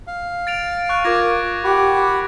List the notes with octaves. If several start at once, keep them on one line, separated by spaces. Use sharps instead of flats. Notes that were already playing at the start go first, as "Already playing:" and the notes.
F5
A6 D7 F7
C#6 F#6
F4 A#4 D6 G#6 A#6
G4 F#5 B5